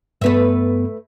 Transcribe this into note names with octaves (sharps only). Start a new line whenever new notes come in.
G2 A3 B3 B4 E5